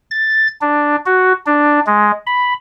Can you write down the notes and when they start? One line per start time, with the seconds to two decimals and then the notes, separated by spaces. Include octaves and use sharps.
0.11 A6
0.61 D4
1.06 F#4
1.46 D4
1.86 G#3
2.27 B5